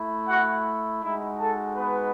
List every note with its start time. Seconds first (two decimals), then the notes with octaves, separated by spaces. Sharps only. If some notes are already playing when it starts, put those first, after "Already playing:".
Already playing: A3 E4
0.29 F#4 F#5
1.03 G#3 D#4 E4 F#4 E5
1.40 A4 A5
1.77 B3 B4